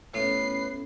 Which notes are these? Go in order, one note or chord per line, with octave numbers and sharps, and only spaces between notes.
A2 A3 B3 C#4 A4 B4 C7